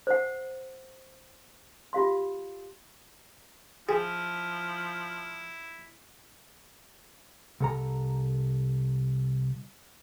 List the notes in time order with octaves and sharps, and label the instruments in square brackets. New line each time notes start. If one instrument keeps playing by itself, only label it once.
[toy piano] C5 F#5
F4 G4 F5 C6
[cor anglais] F3 [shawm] E4 [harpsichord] G#4
[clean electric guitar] C2 A4 A#5